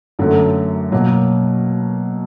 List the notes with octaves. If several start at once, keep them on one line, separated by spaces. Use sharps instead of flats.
F#2 D3 F#3 A3
B2 F#3 A#3